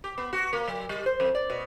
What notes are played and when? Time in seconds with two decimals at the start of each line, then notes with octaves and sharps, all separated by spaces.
0.04 G4
0.18 B3
0.33 F#4
0.53 A#3
0.68 F#3
0.89 G3
1.06 C5
1.20 F2
1.35 D5
1.50 B2